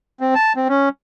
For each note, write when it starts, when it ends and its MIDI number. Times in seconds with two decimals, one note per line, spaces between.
0.20 0.34 60
0.35 0.53 81
0.56 0.68 60
0.69 0.89 61